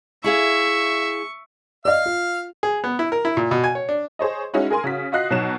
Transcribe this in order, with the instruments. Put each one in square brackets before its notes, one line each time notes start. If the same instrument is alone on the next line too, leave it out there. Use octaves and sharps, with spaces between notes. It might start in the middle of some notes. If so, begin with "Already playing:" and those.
[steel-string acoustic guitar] E4 G#4 F5 [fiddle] E5 [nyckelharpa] C#6
[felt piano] D5 D#5 [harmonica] F5 F6
[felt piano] F4
[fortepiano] G#4
B3
E4
A#4
E4
A#2
B2
G#5
C#5
D4
[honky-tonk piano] G#4 C5 C#5 D#5
G#3 C#4 D#4 E4 F#4
G#4 A#4 G#5 C6
C#3 F#4 B6
F4 F#4 D#5 F#6 C7
B2 F#3 D#4 E7